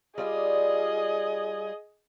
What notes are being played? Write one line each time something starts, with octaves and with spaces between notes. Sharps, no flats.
G3 F4 G#4 D5 D#5